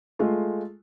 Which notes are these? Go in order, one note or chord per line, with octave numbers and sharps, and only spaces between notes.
G#3 A3 F4